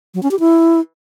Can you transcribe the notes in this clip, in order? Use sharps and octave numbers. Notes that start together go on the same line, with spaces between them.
F#3
C#4
G4
E4